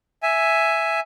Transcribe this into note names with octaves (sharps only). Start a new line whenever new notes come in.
E5 G#5